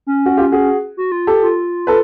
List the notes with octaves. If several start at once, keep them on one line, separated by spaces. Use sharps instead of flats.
C#4
F#4
F4 G4
F#4 G#4
F#4
F4
G4 A4
F4
A4 B4